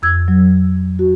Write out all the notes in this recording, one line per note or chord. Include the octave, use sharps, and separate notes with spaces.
F2 E6 G#6
F#3
F#4